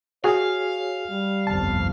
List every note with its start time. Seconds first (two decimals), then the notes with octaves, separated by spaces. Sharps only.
0.24 F#4 G#4 C#5 F5 G#5
1.10 G3
1.47 G1 C2 F2 A5